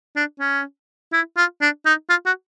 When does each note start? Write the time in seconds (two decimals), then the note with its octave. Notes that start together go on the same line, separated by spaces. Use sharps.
0.16 D4
0.40 C#4
1.13 E4
1.37 F4
1.61 D4
1.86 D#4
2.10 F4
2.26 F#4